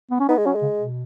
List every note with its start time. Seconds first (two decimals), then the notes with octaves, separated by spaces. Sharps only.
0.11 B3
0.20 C#4
0.29 B3 D#4
0.38 G#3
0.46 F#3 C#4
0.55 G#3
0.62 C#3
0.79 B2